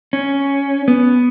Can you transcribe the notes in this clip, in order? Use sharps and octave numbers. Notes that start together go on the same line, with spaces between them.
C#4
B3